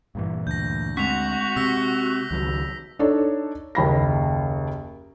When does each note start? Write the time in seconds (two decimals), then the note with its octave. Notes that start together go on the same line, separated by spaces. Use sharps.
0.15 G2 A#2 E3
0.47 D2 G6 A#6
0.97 G#3 C4 F#4 B6 F7
1.56 C3 E6 A#6 B6
2.31 C#2 D#3 F#3
2.99 D4 D#4 A4 C#5
3.75 F#1 D#2 B5 A#6